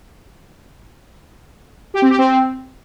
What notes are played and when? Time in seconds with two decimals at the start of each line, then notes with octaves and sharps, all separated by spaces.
1.94 G4
2.02 C4
2.10 G4
2.18 C4